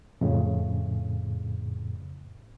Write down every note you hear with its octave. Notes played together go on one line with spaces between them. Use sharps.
F2 A2 C#3